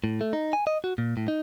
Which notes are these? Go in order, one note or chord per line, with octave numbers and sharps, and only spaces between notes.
A2
A3
D#4
G#5
D#5
F#4
A#2
A2
D#4